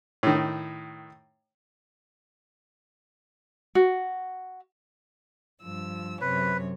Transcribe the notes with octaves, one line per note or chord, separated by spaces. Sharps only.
A2 D#3
F#4
G2 F3 E6
F#2 C3 B4 C#5